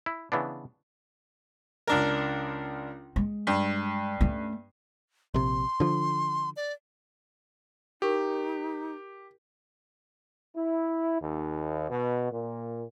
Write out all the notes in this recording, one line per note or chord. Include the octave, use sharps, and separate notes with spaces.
E4
C#3 E3 B3 D4
C#2 D4 A#4
G#3
G2
A3 C#4
A#1 C3 C6
D3 F3
D5
D#4 E4 G4 A#4 C#6
E4
D#2
B2
A#2